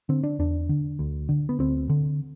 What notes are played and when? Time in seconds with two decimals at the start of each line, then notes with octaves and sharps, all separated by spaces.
0.09 D3 C4
0.23 D4
0.39 E2 D4
0.69 D3
0.99 D2
1.29 D3
1.49 B3
1.59 D2 C4
1.89 D3